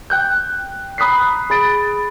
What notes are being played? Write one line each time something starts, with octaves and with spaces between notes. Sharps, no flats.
G5 F#6 G6
A#5 B5 D#6 F#6 B6 C7
G#4 B5 A6 D7